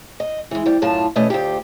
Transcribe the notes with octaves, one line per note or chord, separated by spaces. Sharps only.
D#5
E3 G#3
F2 G3
F#2 A2 F4 A5
E2 B2 A3 C#4 D#5
D2 F4 G4